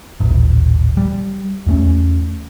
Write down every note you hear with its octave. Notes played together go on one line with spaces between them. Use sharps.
D#1 A1
G3
E2 A3 C#4